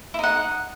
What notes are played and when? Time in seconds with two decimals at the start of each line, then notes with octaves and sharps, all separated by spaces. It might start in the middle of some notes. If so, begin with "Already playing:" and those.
0.14 E4
0.19 D#4
0.23 F#5